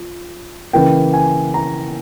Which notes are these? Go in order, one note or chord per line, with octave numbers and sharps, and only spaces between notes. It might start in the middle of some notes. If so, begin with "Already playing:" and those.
Already playing: F3
C#3 E3 A#3 G5
G#5
A#5